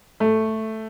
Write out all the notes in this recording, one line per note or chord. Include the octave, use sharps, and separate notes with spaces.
A3